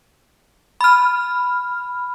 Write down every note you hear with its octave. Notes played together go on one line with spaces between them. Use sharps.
B5 F6